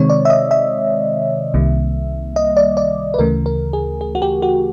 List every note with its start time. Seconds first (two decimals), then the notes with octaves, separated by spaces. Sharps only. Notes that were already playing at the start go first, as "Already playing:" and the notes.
Already playing: C3 D#3 G#3 C4 C#5
0.10 D5
0.25 E5
0.30 D#5
0.51 E5
1.54 C2 C3 D#3 G3 A#3
2.36 D#5
2.57 D5
2.77 D5
3.14 B4
3.18 D2 C#3 E3 A3 A#4
3.46 A#4
3.73 G#4
4.01 G#4
4.15 F#4
4.22 G4
4.42 F#4